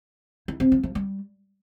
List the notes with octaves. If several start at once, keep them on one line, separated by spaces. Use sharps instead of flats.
E4
C4
F3
F3
G3